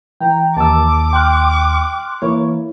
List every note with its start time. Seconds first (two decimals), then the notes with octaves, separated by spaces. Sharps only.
0.21 E3 G5 A#5
0.57 D#2 A5 D6 E6
1.13 G5 C6 F6 F#6
2.22 E3 A#3 E4 C#5